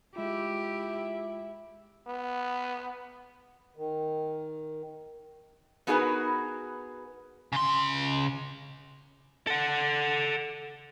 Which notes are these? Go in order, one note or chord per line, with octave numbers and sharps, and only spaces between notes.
G#3 E4 F4 G4
B3
D#3
B3 D#4 F#4 G#4 A#4 B4
C#3 C6
A4 F#5